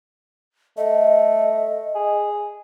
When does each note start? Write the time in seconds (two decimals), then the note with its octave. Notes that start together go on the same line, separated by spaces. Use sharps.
0.77 A3 D#5
1.95 G#4